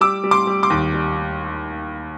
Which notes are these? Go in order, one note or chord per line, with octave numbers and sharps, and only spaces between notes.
G3 D6 E6
G3
C6 D6
G3
C6 D6
D#2
G3